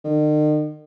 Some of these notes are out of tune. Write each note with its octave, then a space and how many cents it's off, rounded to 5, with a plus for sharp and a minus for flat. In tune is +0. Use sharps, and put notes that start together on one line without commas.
D#3 -45